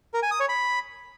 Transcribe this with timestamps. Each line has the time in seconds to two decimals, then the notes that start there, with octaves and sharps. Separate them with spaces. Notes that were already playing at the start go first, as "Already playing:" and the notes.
0.14 A#4
0.23 G#5
0.31 D#6
0.40 C#5
0.49 B5